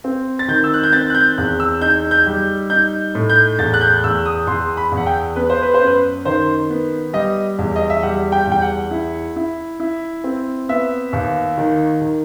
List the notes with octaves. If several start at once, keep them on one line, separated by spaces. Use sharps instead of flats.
C4
A6
D#3 G6
E6
F#6
G6
C4 A6
F#6
G6
E2 F#6
E6
D#4 G6
G6
G3
D#4 G6
A2
G6
E2 A6
F#6
G6
E2 E6
D#6
E2 C6
B5
E2
F#5
G5
B3 B4
C5
B4
C5
F#2
B4
D#3 C5
B3
G3 D#5
E2
D#5
E5
G3 F#5
G5
E2 G5
F#5
E4
E4
E4
C4
B3 E5
D#2
D#3
D#3